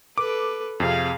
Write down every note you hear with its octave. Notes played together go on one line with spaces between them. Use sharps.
A4 B4 D6
F2 C3 G#4 F5